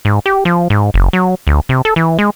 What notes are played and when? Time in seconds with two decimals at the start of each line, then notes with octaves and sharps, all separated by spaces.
0.05 G#2
0.26 G4
0.45 F3
0.70 G#2
0.94 F#1
1.13 F#3
1.47 D2
1.69 C3
1.85 A4
1.96 E3
2.19 G#3